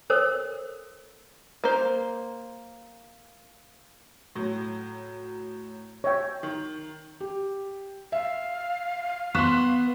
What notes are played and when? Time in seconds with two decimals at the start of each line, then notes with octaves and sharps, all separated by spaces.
0.10 A4 A#4 C5 C#5
1.64 A#3 C5
4.35 A2 F#3
6.04 C#5 E5 G5
6.43 D#3
7.20 G4
8.12 E5 F5
9.35 B3 C6 C#6 F#6 B6 E7